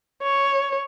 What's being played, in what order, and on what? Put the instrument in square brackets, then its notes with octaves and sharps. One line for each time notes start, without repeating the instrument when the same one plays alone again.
[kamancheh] C#5